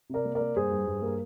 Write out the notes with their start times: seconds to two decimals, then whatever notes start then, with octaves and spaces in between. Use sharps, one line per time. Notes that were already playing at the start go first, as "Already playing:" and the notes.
0.10 C3 A#4 D5
0.25 A#3
0.35 A#4 D5
0.40 A#3
0.55 G2 G#4 C5
0.71 G2
0.86 G2
1.02 A#3 A#4